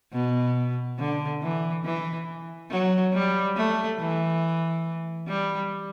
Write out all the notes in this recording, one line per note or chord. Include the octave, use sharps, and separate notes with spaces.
B2
D3
E3
E3
F#3
G3
A3
E3
G3